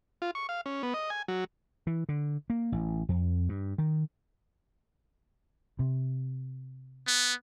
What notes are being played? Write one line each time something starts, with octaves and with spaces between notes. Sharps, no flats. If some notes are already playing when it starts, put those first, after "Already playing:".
F4
C#6
F5
C#4
B3
D#5
G#5
F#3
E3
D3
A#3
A1
F2
G2
D#3
C3
B3